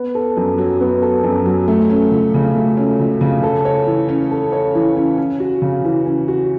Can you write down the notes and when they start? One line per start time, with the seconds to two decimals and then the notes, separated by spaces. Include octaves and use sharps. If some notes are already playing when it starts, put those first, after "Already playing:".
Already playing: B3
0.15 A4
0.37 F#2
0.58 F#3
0.81 B3
1.02 A4
1.24 F#2
1.46 F#3
1.68 A3
1.90 C#4
2.11 C#2
2.34 C#3
2.56 A3
2.77 C#4
2.99 C#2
3.21 C#3
3.43 A4
3.65 C#5
3.87 E3
4.09 C#4
4.31 A4
4.52 C#5
4.75 E3
4.97 C#4
5.18 C#4
5.40 F#4
5.62 C#3
5.84 E3
6.06 C#4
6.28 F#4